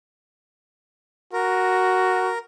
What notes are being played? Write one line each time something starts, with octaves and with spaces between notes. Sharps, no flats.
F#4 A#4